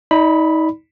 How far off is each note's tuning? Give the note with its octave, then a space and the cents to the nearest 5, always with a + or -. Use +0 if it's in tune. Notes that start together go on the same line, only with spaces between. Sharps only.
D#4 +35 D5 +0 B5 +0